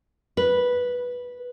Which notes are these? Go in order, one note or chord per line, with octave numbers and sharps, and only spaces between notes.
B4